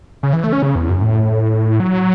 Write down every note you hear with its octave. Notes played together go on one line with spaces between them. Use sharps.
C#3
E3
A3
C#4
C#3
E2
F#2
A2
F#3